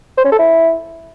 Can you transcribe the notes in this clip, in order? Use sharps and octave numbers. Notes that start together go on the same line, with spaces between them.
C5
C#4
A4
E4